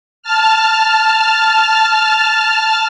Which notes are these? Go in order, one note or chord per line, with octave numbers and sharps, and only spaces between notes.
A5 F6